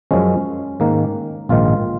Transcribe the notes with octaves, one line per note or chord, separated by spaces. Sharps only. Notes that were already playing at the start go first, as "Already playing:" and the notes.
F#2 F3 G#3 C#4
G#2 D#3 A#3
A#1 G#2 D#3 F4